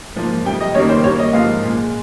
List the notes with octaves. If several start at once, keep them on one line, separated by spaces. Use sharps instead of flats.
G#2 F3 A#3
F2 C3 G3 G5
D#5
G2 D#3 G3 A#3 C#5
C5
G2 G3 A#3 C#5
D#5
G#2 F3 A#3 F5
A#2 G#3